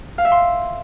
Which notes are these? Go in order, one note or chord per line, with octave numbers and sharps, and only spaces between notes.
F5
E5
C6